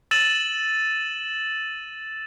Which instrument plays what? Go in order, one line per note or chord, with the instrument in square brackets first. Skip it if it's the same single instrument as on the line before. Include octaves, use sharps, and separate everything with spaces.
[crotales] E6 A6 D#7 E7 F#7